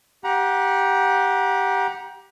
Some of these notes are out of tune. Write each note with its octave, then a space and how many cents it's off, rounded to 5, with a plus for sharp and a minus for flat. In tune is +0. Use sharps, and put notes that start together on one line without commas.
G4 +0 F#5 -15 A#5 +30